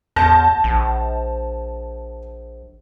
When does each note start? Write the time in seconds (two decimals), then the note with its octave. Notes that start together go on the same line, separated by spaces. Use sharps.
0.16 E2 A5 G6 A#6
0.64 A#1